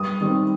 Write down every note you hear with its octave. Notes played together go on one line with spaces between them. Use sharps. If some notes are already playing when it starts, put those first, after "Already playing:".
Already playing: G2 D#6
D#3 G3 C4